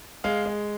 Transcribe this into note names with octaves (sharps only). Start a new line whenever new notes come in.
G#3 F5
G#3